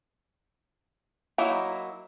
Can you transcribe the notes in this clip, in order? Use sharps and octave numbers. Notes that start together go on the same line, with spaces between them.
F#3 A#3 D#4 E4